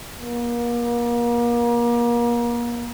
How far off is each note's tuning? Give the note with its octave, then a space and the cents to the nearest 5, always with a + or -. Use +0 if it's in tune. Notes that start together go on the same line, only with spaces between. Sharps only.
A#3 +35